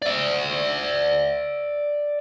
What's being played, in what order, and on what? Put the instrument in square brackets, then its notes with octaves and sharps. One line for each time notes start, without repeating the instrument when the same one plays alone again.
[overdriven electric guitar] D5 E5